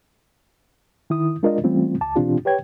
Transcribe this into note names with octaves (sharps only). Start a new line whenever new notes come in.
D#3 E4 D#6
G#3 D4 F4 A#4 D5 D#5
E3 G3 A3 C4 C#4 F4
C#2 A5 D6
B2 E3 C4 D4 F4 G4
G4 B4 C#5 G5 G#6